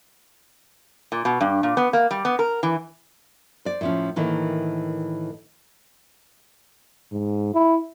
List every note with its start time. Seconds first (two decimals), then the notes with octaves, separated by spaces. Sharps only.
1.12 A#2
1.25 B2
1.41 G2
1.63 A#2
1.77 B3
1.93 A#3
2.11 G3
2.25 B3
2.39 A#4
2.63 E3
3.65 C5 D5
3.81 A2 F3 C#4
4.16 A2 D#3 E3 A#3
7.12 G#2
7.54 E4